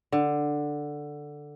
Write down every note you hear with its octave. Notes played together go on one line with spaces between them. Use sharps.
D3